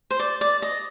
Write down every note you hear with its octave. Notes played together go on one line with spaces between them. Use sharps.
C5
D5
D5
D#5